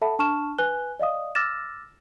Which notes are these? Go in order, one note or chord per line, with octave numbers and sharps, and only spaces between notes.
A4 E5 F#5 A5 B5
D4 A5 C#6 F6 E7
B4 G#5 F#6 G7
D5 D#5 F5 D#6
D6 E6 F6 A6 A#6 E7